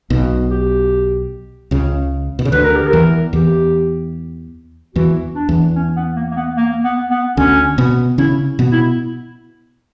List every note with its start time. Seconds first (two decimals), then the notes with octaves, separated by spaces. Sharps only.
0.10 B1 B2
0.50 G4
1.71 C#2 C#3
2.39 B2
2.45 C#3
2.52 D2 D3 B4
2.64 A#4
2.76 G4
2.86 A#4
2.93 E2 E3
3.33 E2 E3 G4
4.95 E2 E3 F#4
5.35 D4
5.49 E2 E3
5.75 C#4
5.96 B3
6.16 A#3
6.31 A#3
6.36 B3
6.57 A#3
6.84 B3
7.11 B3
7.37 D2 D3 C#4
7.78 B2 B3
8.18 C#3 C#4 E4
8.59 B2 B3
8.72 E4